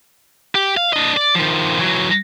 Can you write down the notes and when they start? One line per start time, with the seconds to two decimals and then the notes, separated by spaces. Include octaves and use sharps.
0.55 G4
0.77 F5
0.93 D4 D#5
1.17 D5
1.35 D#3 F3
1.79 E3 F#3